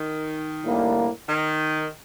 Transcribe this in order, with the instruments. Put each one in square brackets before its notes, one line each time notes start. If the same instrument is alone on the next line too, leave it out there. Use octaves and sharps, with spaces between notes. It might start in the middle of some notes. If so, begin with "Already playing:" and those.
Already playing: [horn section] D#3
[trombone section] A2 G3 A#3 D4
[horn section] D#3